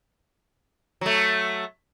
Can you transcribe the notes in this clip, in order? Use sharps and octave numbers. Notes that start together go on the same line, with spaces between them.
F#3 A3